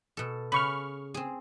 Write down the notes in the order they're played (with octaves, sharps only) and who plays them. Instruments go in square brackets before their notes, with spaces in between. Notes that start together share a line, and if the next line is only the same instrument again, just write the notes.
[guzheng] B2 A4
[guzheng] C#3 [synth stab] B5 C#6 F6
[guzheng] C4 G#4